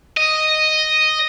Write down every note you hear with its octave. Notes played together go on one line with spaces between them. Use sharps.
D#5